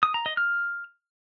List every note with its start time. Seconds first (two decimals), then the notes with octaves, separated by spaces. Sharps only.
0.03 D#6
0.14 A#5
0.26 D#5
0.37 F6